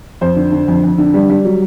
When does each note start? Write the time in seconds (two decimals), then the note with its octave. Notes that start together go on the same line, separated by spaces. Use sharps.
0.21 F2 C5
0.36 D3
0.52 D3
0.68 F2
0.84 F2
0.98 D3
1.14 G3
1.30 G3
1.45 F#3